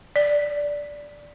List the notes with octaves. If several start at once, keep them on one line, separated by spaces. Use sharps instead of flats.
D5